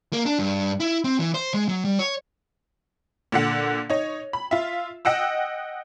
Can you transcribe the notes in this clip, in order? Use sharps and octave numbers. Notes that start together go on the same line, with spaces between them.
A#3
D4
G2
E4
C4
E3
C5
G#3
F#3
G3
C#5
A#2 D3 F#5
D#4 C#5
B5
F4 E5
D#5 F#5 G5 E6